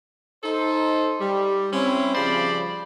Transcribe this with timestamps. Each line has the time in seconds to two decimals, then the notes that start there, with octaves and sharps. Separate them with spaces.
0.44 D#4 A4 C5
1.21 G3
1.73 C4 C#4 E4
2.15 C#3 F3 G3 C5 D5 B5